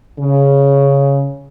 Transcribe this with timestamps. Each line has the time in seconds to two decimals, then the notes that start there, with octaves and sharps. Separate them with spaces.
0.19 C#3